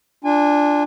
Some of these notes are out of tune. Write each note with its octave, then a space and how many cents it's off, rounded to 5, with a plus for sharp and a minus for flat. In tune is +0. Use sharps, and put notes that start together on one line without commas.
D4 +0 F4 +0 G#5 -25